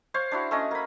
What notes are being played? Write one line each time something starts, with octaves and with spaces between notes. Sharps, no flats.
C5 C#5 F5
D4 E4 F#4
A3 C#4 D#5
A#3 B5